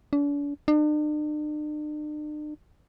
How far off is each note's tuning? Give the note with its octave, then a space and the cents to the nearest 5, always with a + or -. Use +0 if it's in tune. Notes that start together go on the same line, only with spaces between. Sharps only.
D4 -40
D4 +45